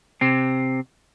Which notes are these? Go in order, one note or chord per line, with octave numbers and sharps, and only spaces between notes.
C3 C4